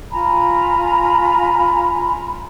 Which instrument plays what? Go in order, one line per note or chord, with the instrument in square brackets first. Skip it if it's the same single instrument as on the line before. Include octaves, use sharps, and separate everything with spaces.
[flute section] F4 G#5 A#5 B5